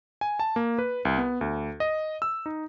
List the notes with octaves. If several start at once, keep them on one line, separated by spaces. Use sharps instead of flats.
G#5
A5
A#3
B4
C2
B3
D2
D#5
E6
D#4